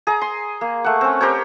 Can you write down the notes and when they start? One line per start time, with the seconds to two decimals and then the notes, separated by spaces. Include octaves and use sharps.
0.07 G#4 A#5
0.22 C6
0.61 A#3
0.84 A3 F#5
1.01 C4 C#4
1.21 G4 A#4 C5 C#5